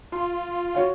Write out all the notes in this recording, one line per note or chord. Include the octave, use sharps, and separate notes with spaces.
F4 C6
F#4 C#5 F5